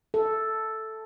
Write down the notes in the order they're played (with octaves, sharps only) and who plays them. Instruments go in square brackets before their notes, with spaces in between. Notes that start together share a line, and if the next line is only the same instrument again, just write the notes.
[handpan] A4